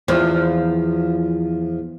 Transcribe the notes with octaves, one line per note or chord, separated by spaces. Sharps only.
E2 F3